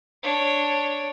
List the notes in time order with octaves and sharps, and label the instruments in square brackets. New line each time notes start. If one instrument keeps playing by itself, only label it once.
[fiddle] D4 C#5